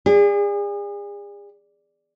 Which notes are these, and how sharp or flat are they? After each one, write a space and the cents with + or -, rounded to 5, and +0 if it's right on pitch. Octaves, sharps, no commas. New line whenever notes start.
G#4 -35 D5 +0